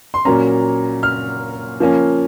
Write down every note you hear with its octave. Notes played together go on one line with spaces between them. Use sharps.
C6
A#2 F#3 A#3 C#4 A#5
F6
F3 A#3 C#4